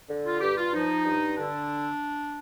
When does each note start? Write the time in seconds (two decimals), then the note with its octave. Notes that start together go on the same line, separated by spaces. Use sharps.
0.08 D3
0.26 F4
0.41 G2 G4
0.57 F4
0.73 F3 D#4
1.05 G2
1.37 D3 D4